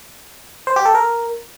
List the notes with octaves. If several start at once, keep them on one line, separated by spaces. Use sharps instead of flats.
C5
G4
A4
A#4